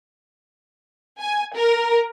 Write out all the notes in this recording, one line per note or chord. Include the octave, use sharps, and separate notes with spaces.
G#5
A#4